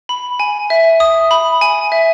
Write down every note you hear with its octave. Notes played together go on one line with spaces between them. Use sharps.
B5
G#5
E5
D#6
B5
G#5
E5